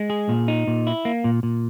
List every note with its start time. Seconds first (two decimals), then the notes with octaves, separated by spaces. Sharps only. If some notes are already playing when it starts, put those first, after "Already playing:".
Already playing: G#3
0.10 G#4
0.29 A#2
0.48 D#4
0.67 A#2
0.87 E4
1.05 A#3
1.24 A#2
1.43 A#2